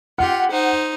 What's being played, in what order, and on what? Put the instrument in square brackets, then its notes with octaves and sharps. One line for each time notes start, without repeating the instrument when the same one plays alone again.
[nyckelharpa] F4 G4 [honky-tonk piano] F#5
[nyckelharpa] D#4 C5